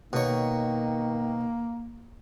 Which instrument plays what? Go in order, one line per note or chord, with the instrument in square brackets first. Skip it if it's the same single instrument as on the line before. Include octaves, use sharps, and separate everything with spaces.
[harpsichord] B2 C#5 [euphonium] D#3 [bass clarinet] A#3